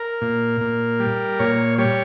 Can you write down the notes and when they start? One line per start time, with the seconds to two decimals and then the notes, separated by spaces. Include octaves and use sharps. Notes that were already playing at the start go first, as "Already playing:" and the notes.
Already playing: A#4
0.21 A#2
0.61 A#2
1.00 G3
1.39 A#2 C#5
1.78 G3 C#5